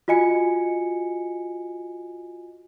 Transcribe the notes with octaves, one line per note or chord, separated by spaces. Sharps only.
F4 F#4 D#5 G#5 C#7